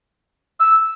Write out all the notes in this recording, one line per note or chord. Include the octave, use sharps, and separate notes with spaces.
E6